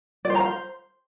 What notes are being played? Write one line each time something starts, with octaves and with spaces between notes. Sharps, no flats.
D5
C5
A#5
F5
C5